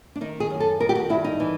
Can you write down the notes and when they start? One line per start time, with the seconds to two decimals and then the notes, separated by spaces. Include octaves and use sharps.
0.16 D4
0.21 D#3 D#4
0.40 G#4
0.50 F#2
0.60 A4
0.80 D#3 A#4
0.89 G4
0.95 F#4
1.09 G2 E4
1.24 D#4
1.40 E3